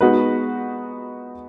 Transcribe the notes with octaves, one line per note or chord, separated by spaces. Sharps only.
G#3 B3 D#4 F#4 B4